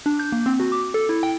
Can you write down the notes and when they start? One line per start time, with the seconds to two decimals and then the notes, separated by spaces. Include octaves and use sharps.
0.06 D4
0.19 G6
0.32 A#3
0.46 C4
0.60 F#4
0.72 D6
0.94 A4
1.09 E4
1.23 G5